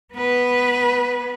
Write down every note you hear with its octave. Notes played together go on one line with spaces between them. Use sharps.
B3 B4